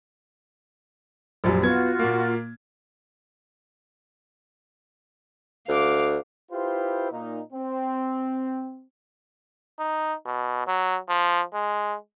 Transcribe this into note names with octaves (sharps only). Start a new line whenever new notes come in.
A#1 F#2 G3
B3 F4 F#4 G#6
A#2 A#3
D2 F5 D6
E4 F4 G4 B4 C5
A#2 D#4
C4
D#4
B2
F#3
F3
G#3